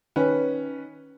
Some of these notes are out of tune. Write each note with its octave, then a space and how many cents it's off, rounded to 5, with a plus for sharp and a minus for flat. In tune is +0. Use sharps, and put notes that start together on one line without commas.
D#3 +0 C#4 +0 B4 -5